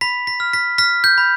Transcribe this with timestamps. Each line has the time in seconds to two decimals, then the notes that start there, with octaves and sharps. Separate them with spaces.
0.01 B5 B6
0.27 B6
0.40 F6
0.53 B6
0.78 F6 B6
1.04 G6
1.18 B5